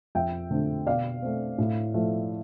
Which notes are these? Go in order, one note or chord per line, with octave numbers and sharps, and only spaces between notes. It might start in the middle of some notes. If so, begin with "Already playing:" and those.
F2 E5 G5
D3 A3 C4
B2 D5 F5
A3 C4
A2
F3 A3